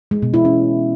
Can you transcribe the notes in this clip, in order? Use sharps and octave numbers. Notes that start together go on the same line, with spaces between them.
G#3
B2
E4
C#4